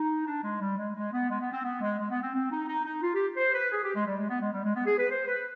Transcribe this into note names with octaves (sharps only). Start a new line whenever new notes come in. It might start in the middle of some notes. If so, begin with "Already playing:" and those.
Already playing: D#4
D4
G#3
G3
G#3
G#3
B3
G#3
B3
C4
B3
G#3
G#3
B3
C4
C4
D#4
D#4
D#4
F4
G4
C5
B4
G#4
G4
G#3
G3
G#3
B3
G#3
G3
G#3
B3
G#4
B4
C5
B4